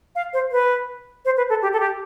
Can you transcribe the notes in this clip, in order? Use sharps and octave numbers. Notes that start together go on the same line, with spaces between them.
F5
C5
B4
C5
B4
A4
G4
A4
G4